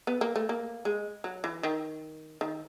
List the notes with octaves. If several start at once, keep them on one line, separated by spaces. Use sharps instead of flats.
B3
A#3
A3
A#3
G#3
F#3
E3
D#3
D#3